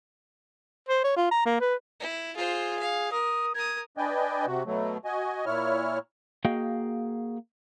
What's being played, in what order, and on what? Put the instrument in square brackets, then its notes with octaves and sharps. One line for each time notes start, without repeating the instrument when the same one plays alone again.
[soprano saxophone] C5
C#5
F4
A#5
A#3
B4
[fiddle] E4
[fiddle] F4 C5 [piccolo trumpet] G#4
[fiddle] F5
[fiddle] A#4 [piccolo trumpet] D#6
[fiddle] A#4 D#6 [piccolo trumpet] G#6
[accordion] D4 B4 D5 D#5 G5 G#5
C3 F#4
B2 F#3 A3
F#4 D#5 G#5
A#2 E4 C#5 F6
[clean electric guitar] A#3 F#4 G#4 D#5 F5 G5